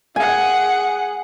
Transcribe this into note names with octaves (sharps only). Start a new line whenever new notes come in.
G#4 F#5 G#5